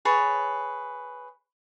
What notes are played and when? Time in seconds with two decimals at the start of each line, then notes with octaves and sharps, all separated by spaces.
0.05 G#4 B4 C#5 A5